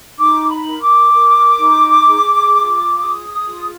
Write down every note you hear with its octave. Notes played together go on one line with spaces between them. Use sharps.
D#4 D6
B5
A#4
D6
A#4
D#4
G#4
F4
G#4 D#6
D#6
F4